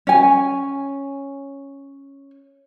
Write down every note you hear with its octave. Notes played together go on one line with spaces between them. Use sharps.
C#4 G#5